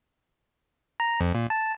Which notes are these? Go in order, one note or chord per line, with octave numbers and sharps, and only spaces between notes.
A#5
F2
A#2
A5